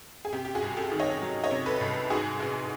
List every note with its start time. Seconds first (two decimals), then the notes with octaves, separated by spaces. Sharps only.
0.25 G#4
0.33 C3 G4
0.45 G4
0.55 F#4 G#4
0.62 C2
0.77 G4 A4
0.92 D#3
0.99 C#5 D#5
1.22 F#3
1.44 C#5 D#5
1.51 C3
1.66 A4 B4
1.81 C2
2.10 G#2 F#4 G#4
2.40 A1